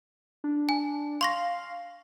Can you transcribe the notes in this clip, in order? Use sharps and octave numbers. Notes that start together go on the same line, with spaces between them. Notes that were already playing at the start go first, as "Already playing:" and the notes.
D4
G#5
F5 C6 C#6 A#6